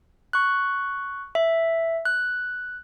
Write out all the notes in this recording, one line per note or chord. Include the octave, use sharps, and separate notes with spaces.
C#6 F#6
E5
F#6